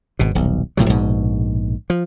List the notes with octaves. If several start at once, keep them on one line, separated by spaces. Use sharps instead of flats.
G#1 B2
D#1 B1
D1 A2 C3 F#3
A#1 G#2 B2
F3